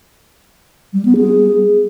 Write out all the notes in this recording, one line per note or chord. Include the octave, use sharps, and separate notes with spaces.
G3
B3
G#4